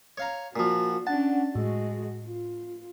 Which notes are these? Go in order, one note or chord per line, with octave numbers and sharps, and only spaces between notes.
C#5 F5 A#5
A#2 F3 F#4
C#4 D4 F#5 A5
A2 G#3 F#4
F4